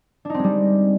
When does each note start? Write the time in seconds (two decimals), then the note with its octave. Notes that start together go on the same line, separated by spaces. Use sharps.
0.25 D4
0.30 D#4
0.34 C4
0.39 G#3
0.44 G3